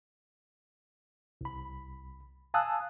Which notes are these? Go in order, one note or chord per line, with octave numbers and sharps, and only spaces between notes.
C2 B5
F5 G#5 A5 D#6 E6 F#6